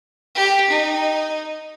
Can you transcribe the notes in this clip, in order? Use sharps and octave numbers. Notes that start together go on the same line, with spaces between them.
G4
D#4